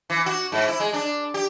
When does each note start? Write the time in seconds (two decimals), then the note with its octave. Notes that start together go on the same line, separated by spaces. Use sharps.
0.10 E3
0.26 F#4
0.52 G#2
0.68 E4
0.80 G#3
0.93 D4
1.34 G4